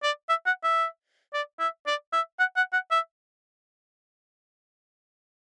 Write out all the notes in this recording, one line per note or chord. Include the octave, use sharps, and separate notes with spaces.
D5
E5
F#5
E5
D5
E5
D5
E5
F#5
F#5
F#5
E5